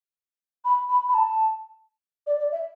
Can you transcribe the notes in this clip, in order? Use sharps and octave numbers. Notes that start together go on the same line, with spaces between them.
B5
B5
B5
A5
D5
D5
E5